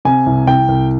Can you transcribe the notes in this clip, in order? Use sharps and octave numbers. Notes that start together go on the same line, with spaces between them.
C3 G#5
C2
C2 G5
C2